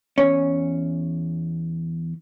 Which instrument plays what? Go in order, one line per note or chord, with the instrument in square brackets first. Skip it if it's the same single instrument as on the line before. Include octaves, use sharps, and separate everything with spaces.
[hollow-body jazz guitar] E2 C#4